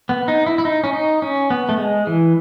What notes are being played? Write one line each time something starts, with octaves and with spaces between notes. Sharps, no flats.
B3
D#4
E4
E4
D#4
C#4
D#4
C#4
B3
A3
G#3
E3